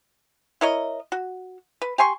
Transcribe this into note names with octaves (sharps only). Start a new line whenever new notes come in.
E4 A#4 C#5 D#5
F#4
B4
G4 G#5 C6 C#6